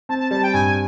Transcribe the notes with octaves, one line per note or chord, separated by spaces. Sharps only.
C4 A5
A5
G3 A5
G5
G2 G#5